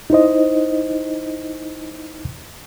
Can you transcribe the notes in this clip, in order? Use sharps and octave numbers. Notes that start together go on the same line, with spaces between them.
D#4 E4 C5 D#5